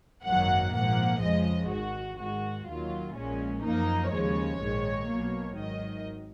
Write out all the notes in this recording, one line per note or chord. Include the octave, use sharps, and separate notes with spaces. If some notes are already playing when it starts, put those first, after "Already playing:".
G#1 F#2 D#3 F#3 A#3 F#5
A#1 G#2 F3 A#3 F#5
F2 C#3 F3 G#3 D#5
G#1 G#2 D#3 F#4
G#2 D#3 G#3 F#4
D#2 D#3 F#3 F4
A#1 A#2 G#3 C#4
F#2 F3 A#3 D#4
D#2 C#3 F3 G#3 C#5
A#1 G#2 D#3 G#3
B1 B2 F#3 A#3
G#1 G#2 D#3 F#3 D#5